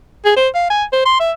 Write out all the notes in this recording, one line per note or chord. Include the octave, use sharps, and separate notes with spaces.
G#4
C5
F5
G#5
C5
C6
E5